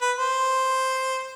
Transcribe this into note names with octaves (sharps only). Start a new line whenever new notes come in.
B4
C5